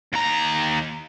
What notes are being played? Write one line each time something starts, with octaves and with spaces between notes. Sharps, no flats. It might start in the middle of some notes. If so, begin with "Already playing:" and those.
D#2 A#5